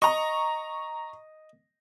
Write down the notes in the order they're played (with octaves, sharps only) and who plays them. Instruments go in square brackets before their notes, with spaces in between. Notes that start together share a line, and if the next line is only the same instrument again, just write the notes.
[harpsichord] D#5 [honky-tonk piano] A#5 C#6